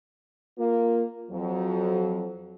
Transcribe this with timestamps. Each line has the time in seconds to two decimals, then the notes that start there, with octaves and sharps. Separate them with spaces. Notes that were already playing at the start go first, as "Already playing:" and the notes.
0.58 A#3 F4
1.31 F2 F#3